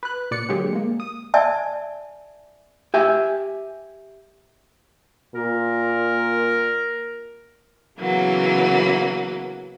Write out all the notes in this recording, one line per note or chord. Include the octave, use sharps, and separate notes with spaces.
B4 F#6
A#2 D5 C#7
D3 F#3 G#3 A#3 G4 G#4
G#3 A#3
D#6
D5 E5 G#5 A5
G4 E5 G#5
A#2 A#4
C#3 E3 F#3 A#3 B3